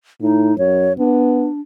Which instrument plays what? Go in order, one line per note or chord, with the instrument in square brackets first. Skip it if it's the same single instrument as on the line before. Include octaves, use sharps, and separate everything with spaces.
[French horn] A2 [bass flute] D#4
[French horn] F#2 [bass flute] C#5
[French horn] B3 [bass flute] D4